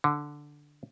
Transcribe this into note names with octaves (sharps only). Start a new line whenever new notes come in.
D3